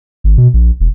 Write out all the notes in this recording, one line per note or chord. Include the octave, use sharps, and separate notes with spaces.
G#1
B2
A#1
E1